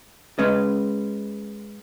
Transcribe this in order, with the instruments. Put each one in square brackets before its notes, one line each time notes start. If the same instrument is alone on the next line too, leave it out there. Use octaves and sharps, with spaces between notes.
[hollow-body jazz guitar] G#3 C#4 B4 D#5